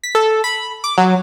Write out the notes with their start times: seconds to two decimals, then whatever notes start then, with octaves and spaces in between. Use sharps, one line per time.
0.04 B6
0.15 A4
0.44 B5
0.84 D6
0.98 F#3